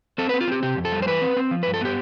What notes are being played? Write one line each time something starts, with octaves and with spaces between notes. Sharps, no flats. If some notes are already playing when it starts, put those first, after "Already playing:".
C4 A4
B4
C4
F4
C4 G4
C3 G4
F2
A4
G3
C5
E3 B4
C4
C4
F3
B4
G2
A4
B3 G4